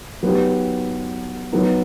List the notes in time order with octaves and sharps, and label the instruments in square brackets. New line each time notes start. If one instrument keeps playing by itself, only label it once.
[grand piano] F#3 B3 D#4 G4
F#3 B3 D#4